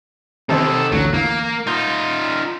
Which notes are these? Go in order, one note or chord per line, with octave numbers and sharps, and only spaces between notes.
C3 D#3 C4 D#4 A4
A1 D2 F#3
E2 A#3
D#4 F4 G6